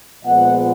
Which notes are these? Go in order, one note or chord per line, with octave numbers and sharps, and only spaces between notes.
A#2 F3 G#3 B3 D#5 F#5